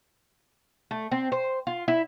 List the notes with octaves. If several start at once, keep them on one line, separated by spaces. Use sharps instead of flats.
A3
C4
C5
F4
E4